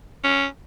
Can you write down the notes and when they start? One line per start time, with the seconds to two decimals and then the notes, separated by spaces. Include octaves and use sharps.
0.24 C#4